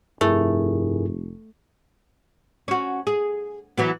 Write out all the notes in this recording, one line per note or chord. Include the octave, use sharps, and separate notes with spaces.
F1 G2 A3 E4 G#4 A#4
C#4 F#4
G#4
E3 F#3 B3